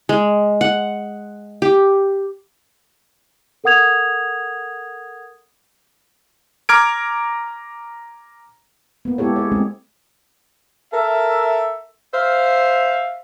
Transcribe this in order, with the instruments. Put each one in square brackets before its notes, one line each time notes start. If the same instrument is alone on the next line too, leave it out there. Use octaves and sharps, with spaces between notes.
[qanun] G#3
F#5
G4
[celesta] A4 A#4 F#5 D#6 G#6 F7
[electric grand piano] A#5 D6 F6 G#6 D7
[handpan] A#3 B3
G#3 B3 E4 G4 A4 C#5
G#4 C#5
G#3 A3 C4 C#4
[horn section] A4 A#4 E5
C5 E5 F5